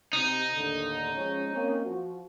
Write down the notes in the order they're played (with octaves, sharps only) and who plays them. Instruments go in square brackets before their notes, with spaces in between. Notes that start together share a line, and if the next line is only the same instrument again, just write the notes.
[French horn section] C3 [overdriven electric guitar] D#4
[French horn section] D#2 A2 D3
F3 G#3 C#4
A#3 C4 C#4
F3 F#4